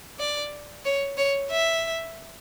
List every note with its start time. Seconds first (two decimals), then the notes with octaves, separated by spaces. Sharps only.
0.19 D5
0.85 C#5
1.18 C#5
1.51 E5